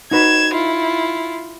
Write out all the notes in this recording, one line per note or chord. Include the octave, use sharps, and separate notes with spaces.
D#4 F#4 B4 G#6 E7
E4 F4